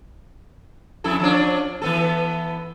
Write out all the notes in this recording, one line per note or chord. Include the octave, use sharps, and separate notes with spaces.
F2 E4 A4
F3 C#4 D4
E3 B3 A4